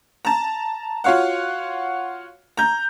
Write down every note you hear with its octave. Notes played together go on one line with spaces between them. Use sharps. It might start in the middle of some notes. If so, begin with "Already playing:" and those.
A5 A#5
F4 F#4 C#5 F5 F#5
A#5 G6